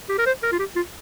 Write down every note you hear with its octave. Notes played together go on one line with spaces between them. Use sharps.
G4
A#4
C5
A#4
F4
G4
F4